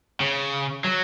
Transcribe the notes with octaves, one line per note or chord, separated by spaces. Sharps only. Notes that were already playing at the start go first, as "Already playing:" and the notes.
C#3
F#3